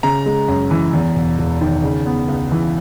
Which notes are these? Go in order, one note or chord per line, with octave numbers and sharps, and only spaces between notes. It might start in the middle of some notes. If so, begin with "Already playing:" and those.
C#3 A#5
G#3
F#2
E3
E2
E1
E1
D#3
C#3
B3
C#2
E3